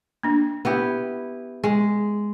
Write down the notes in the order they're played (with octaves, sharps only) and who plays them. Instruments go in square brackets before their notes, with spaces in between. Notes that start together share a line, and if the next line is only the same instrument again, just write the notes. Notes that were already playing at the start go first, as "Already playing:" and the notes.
[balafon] A#3 D4
[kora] B3 E4 G4
G#3